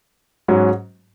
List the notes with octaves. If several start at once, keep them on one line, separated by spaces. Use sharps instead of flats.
G#2 F#3 C#4 F#4